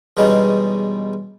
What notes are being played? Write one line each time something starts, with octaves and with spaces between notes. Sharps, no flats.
E2 B2 G3 G#3 C#4 D#4